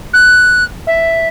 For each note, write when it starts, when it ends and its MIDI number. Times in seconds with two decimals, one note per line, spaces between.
0.13 0.64 90
0.87 1.28 76